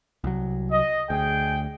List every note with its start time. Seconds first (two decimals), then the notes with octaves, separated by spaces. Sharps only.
0.24 C2 F#3
0.71 D#5
1.10 D2 G#4 G5